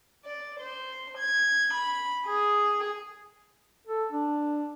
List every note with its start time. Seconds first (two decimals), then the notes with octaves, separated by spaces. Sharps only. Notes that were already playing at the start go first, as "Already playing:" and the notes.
0.23 D5
0.59 C5
1.17 G#6
1.73 B5
2.26 G#4
3.88 A4
4.12 D4